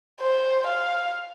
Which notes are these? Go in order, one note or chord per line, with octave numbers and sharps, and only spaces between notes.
C5
F5